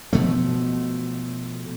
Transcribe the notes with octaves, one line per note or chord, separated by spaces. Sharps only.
B2 F3 A3